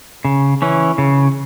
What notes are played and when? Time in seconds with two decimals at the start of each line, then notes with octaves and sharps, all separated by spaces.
0.25 C#3
0.62 E3 C#4
0.98 C#3